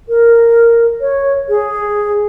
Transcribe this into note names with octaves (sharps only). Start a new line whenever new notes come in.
A#4
C#5
G#4